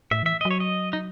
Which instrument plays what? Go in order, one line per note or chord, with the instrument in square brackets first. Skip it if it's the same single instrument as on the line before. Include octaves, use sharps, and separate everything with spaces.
[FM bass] A2 [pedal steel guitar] E5
[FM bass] E3 [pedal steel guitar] E5
[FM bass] F#3 [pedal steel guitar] D#5
[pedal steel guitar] C#5
D#5
D#4